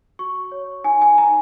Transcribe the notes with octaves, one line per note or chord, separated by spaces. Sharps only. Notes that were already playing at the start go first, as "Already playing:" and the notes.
F#4 C#6
C#5
D#4 G#5
G#5
D#4 A#5